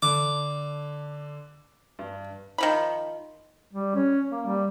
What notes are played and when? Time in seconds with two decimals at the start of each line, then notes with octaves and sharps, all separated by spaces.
0.02 D3 D6
1.99 G2
2.58 D#3 F3 B5
3.73 G3
3.95 C#4
4.32 A#3
4.46 G3